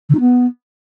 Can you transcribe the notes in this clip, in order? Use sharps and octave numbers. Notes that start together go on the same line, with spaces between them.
D3
D#4
B3